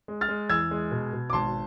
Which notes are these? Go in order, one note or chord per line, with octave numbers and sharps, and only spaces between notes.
G#3
F6 A6
G#3
E2 E6 G#6
G#3
B2
B2
D6
G#1 A5 C6